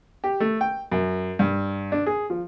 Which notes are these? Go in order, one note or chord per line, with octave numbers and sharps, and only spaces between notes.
G4
A3
G5
F#2
G2
D4
G#4
F3